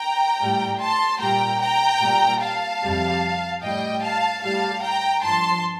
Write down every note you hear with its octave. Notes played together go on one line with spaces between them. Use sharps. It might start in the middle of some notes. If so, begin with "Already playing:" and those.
Already playing: G5 A#5
A2 G3
A5 C6
A#2 G3 G5 A#5
G5 A#5
A#2 G3
F5 A5
F2 C3 G3
A2 G3 D#5 G5
F5 A5
A2 G3 F5 A5
G5 A#5
G2 F3 A5 C6